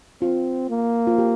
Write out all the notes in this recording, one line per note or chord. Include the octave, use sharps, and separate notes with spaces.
C4 F4
A#3
F4
G4